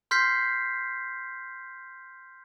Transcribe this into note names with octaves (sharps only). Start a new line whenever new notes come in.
C6 F6 G6 B6 C7